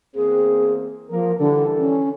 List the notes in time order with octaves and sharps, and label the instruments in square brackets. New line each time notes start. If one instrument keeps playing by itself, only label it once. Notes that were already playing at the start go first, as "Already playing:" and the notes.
[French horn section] E2 A#3 C4 [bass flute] G#4
[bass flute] F3 [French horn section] A#3 A#4
[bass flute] D3 [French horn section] E3 G3 A4
[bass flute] C#4